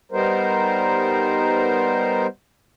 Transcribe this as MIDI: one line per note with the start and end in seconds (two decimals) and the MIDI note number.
0.12 2.27 55
0.12 2.27 59
0.12 2.27 63
0.12 2.27 70
0.12 2.27 72